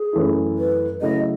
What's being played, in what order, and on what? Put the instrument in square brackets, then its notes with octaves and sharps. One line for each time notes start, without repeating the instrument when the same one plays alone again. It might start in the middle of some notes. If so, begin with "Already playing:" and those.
Already playing: [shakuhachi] G#4
[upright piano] F#2 E3 A3 E4
[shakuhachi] B4
[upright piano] C#3 F#3 A3 E4 A4 [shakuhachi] D#5